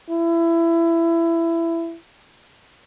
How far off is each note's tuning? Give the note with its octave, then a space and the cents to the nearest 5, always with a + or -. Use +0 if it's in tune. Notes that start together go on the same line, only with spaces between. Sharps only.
E4 +20